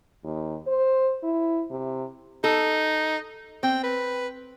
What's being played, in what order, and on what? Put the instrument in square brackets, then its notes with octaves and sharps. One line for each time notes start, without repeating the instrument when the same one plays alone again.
[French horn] D#2
C5
E4
C3
[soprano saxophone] D#4 [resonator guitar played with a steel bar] A4
[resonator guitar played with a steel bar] C4 [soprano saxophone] G5
[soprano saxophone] B4